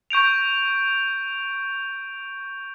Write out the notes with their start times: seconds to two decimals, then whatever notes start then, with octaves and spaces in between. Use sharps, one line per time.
0.10 C#6 G6 D7 F7